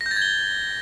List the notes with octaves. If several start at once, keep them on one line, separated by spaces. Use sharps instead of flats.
A#6
G6
A6
G#6
G7